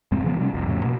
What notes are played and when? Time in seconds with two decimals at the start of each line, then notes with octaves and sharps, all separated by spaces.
0.12 E1 G2 G#3 C4
0.24 C#3 E3 F3 B3
0.39 C3 G3 C4 C#4
0.54 F1 C2 F2
0.67 F2 A2 C#3
0.84 B2 A#3